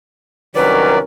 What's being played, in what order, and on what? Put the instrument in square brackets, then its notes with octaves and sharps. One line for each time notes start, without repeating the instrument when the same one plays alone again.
[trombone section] C2 C#4 A#4 [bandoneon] D#3 F#3 D5 [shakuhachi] B4